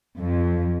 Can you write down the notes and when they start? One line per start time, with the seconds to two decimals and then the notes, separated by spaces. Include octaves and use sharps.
0.18 F2